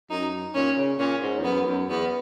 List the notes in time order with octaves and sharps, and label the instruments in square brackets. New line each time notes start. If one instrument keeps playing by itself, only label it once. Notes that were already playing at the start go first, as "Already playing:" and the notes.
[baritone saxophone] F#2 [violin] D#4
[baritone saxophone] A#2 [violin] C#4
[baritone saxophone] C#3
[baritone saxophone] A#2 [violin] C#4
[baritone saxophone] G#2
E2
[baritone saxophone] F#2 [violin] B3
[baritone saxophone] F#2
[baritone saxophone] E2 [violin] B3